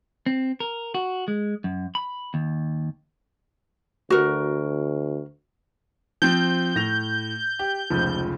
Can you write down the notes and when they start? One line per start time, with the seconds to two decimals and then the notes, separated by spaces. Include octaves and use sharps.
0.26 C4
0.60 A#4
0.94 F#4
1.28 G#3
1.64 F#2
1.95 B5
2.34 D#2
4.10 D2 F#4 A#4
6.22 F3 C4 G6
6.75 A2 A#6 F7
7.59 G4
7.90 F1 C#2 F3